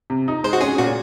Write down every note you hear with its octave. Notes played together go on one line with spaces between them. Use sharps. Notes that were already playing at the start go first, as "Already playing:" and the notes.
C3
D#4
G#3 C5
F#4
C#4 G#4
A#2 F#4